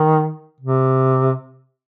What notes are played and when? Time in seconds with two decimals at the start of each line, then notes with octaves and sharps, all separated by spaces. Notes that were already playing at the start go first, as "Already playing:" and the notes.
Already playing: D#3
0.60 C3